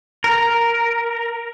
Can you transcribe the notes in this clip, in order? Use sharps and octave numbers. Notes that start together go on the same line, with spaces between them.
A#4